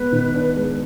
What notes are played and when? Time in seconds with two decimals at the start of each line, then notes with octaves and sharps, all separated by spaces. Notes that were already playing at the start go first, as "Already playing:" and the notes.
Already playing: G#3 B3 B4
0.12 D#3
0.35 D4
0.56 G#3